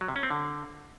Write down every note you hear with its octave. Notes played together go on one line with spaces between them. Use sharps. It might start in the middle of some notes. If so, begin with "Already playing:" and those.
F#3
C3
C#4
C4
D3